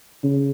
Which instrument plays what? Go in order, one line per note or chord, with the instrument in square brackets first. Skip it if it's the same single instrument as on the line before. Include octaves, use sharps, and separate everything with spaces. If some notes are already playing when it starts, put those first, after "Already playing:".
[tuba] C#3